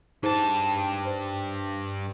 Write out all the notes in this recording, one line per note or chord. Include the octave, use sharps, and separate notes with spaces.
G2 D#4 G#4 C5 A5
C5